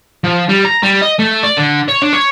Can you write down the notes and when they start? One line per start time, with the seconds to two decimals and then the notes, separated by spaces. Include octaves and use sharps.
0.24 F3
0.49 G3
0.65 A#5
0.83 G3
1.01 D#5
1.19 A3
1.43 D5
1.57 D3
1.88 C#5
2.02 D4
2.13 C#5